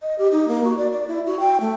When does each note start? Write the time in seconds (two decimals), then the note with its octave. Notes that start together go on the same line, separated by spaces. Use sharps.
0.02 D#5
0.18 G4
0.32 D#4
0.48 A#3
0.64 F#4
0.78 D5
0.92 D5
1.08 E4
1.26 F#4
1.40 G5
1.61 A3